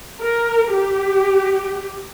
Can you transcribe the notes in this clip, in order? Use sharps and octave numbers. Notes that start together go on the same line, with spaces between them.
A#4
G4